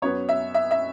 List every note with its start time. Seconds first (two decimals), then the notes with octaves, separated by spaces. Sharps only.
0.02 F#2 F#3 B3 C#5
0.29 E5
0.54 E5
0.71 E5